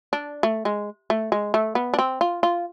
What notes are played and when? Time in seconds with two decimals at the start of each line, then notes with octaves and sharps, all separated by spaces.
0.13 D4
0.43 A3
0.65 G#3
1.10 A3
1.32 G#3
1.54 A3
1.75 B3
1.94 D4
1.99 C4
2.21 F4
2.43 F4